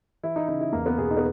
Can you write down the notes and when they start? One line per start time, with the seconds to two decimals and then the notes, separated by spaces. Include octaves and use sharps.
0.23 E3 E4
0.36 D#4
0.48 C#3 D#4
0.61 E4
0.73 E2 A#3
0.86 B3
0.98 B2 G#4
1.10 D#4
1.17 B3